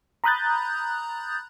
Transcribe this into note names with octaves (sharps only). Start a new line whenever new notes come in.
A#5 B5 D#6 F#6 G6 A6